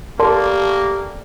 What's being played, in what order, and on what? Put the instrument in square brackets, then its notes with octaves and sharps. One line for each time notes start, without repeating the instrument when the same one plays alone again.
[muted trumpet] A#3 [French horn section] G4 [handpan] A4 D5 [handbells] A#4 A5 C6